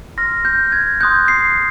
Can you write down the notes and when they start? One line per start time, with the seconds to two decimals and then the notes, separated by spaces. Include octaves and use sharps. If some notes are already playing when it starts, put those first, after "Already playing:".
0.18 C6 F6 A#6
0.45 G6
0.72 G#6
1.01 C6 D#6 F#6 G6
1.28 C7